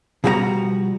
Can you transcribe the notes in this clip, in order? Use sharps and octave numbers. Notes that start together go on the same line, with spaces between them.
B2 F3 G3 F#4 B4 A#5